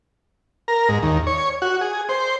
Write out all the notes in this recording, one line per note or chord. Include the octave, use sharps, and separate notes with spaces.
A#4
G#2
D#2
C#5
F#4
G#4
C5